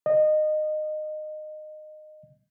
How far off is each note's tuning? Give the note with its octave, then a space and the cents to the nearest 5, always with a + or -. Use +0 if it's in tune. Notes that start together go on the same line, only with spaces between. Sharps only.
D#5 -20